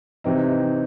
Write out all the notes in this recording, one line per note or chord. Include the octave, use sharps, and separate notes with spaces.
C3 E3 C4 D#4